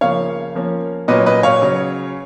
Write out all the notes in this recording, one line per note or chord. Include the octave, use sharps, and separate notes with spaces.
C#3 F3 A#3 C#5 F5
F3 A#3 C#4
A#2 F#3 C#4 B4 D#5
B4 D#5
C#5 F5
C#3 F#3 C#4